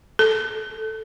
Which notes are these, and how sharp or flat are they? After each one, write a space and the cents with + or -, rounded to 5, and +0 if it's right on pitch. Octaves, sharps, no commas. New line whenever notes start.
A4 +5